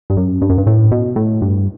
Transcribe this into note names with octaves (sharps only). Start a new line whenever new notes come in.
G2
F#2
G2
F#2
G2
A2
B2
A2
G2